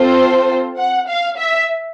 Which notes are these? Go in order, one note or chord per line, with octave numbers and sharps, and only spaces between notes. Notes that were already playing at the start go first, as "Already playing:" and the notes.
Already playing: C4 F4 A4 C5
F#5
F5
E5